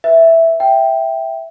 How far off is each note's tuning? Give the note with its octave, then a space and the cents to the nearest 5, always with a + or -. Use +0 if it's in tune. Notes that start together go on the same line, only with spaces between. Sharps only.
B4 +0 E5 +0
E5 +0 G5 +0